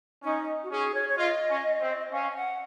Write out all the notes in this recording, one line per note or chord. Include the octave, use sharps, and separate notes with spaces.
C#4 D#4
F#4
C#4 G#4
C#5
C#5
F4 D#5
C#4
C4
C#4 F5
G#5
F#5